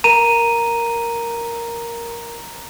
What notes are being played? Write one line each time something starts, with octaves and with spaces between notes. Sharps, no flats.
A#4 A#5 D#7